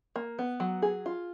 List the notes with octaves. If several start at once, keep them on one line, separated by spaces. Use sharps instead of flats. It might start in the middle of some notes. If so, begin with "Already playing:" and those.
A#3
B3
F#3
G#4
F4